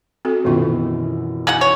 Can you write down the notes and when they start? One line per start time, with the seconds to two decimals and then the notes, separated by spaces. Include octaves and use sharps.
0.25 C4 F#4 A4
0.45 F#2 B2 D#3 E3 B3 F4
1.47 G#3 D#4 F#5
1.61 C#5